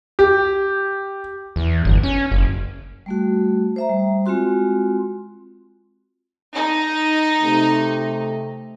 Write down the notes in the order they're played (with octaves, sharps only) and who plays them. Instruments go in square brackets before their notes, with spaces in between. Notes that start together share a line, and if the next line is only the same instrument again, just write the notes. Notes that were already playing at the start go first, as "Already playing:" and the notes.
[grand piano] G4
[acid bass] E2
G1
C#4
F#1
[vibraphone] G3 A3 F#4
C5 E5 A#5
G3
G#3 C4 F4 F#4 C6
[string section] D#4
[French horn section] C3 A3